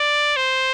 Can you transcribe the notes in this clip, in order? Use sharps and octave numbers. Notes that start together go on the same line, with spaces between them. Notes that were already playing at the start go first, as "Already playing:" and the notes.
Already playing: D5
C5